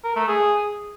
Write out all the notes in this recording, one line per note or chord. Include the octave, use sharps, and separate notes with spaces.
A#4
A3
G#4